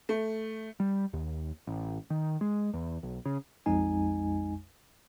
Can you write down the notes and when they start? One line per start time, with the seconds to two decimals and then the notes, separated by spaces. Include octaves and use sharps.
0.09 A3
0.80 G3
1.13 D#2
1.67 A1
2.10 D#3
2.41 G#3
2.74 E2
3.03 B1
3.25 C#3
3.66 A#1 F2 G#3 D#4 G#5